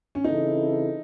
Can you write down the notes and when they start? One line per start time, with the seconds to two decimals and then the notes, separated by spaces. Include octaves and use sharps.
0.15 C#4
0.24 C#3 E3 C4 D#4 E4 A4